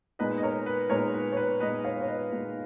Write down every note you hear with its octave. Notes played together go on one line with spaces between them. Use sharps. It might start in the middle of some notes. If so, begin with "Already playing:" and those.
A#2 G#3 B3 D#4 B4 D#5
D#5
A#4 C#5
B4
A#2 G#3 B3 D#4 A#4 C#5
B4
C#5
B4
A#2 G#3 B3 D#4 B4 D#5
C#5 F5
C#5
B4 D#5
A#2 G#3 B3 D#4